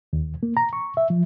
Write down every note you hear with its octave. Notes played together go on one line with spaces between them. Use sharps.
D#2
A#3
A#5
C#6
E5
F3